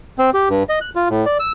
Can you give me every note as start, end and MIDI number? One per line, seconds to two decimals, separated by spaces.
0.18 0.30 60
0.34 0.49 67
0.50 0.63 43
0.69 0.79 75
0.81 0.90 90
0.96 1.08 65
1.09 1.25 45
1.26 1.38 74
1.40 1.52 88